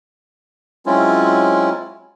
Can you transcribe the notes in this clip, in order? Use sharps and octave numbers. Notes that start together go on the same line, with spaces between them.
F#3 G#3 C4 C#4 E4 F4